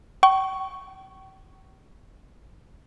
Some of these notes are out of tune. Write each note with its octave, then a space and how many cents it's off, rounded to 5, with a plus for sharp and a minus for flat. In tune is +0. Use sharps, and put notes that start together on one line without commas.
G5 -40 C#6 +0